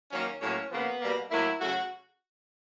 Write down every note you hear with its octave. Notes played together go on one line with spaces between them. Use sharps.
D#3 F#3 A#3 C#4
A2 F#3 A#3 C#4
C#3 F3 A#3 B3
B2 G3 A#3
A2 F#3 A#3 E4
C#3 F#3 A3 F#4